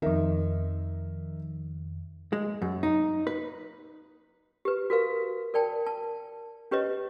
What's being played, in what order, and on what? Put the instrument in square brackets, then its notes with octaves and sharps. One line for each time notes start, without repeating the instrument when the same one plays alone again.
[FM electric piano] F2 D#3 [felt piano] D#4 A#4 E5
[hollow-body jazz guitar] G#3
F#2
D#4
B4
[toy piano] G4 B4
F#4 A#4 B4 F5
A#4 D5 G5 A5
A5
C#4 G4 B4 C#5 D#5